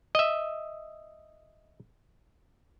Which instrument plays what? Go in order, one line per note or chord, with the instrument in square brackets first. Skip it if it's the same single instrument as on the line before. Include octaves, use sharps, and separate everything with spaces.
[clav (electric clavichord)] D#5 E5